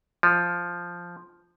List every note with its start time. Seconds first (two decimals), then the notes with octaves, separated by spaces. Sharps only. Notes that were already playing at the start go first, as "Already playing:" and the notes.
0.23 F3